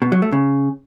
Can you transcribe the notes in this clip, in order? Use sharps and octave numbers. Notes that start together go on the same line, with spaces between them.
B2
F#3
A3
C#3